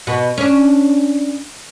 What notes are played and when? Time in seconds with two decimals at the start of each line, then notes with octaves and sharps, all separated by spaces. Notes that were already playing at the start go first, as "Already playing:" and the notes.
0.07 B2 B3
0.38 C#4 D4